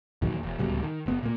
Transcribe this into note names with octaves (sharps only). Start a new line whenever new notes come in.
E2 A#2 D#3 F#3
E1
D1 C#2 B2 G3
D#3
F#1 B3
A#2 A#3